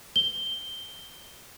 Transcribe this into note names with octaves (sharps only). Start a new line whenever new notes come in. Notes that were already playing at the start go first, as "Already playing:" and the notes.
G7